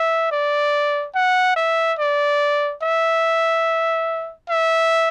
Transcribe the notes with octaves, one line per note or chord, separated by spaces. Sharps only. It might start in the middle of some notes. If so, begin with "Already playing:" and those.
Already playing: E5
D5
F#5
E5
D5
E5
E5